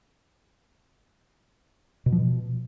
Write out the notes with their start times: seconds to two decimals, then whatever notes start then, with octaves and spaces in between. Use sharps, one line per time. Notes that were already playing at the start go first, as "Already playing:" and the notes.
2.06 B2
2.12 F3
2.19 B2